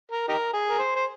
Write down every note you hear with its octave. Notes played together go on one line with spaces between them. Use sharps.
A#4
D#4 G4 A#4
G#4
A#4
C5
C5